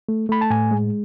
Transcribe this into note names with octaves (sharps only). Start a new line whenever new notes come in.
A3
A3 B5
A5
A2 G#5
G#3